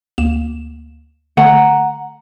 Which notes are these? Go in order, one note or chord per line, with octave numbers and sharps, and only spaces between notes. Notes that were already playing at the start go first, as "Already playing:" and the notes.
D2 A#3 E7
D3 A3 F#5 A#5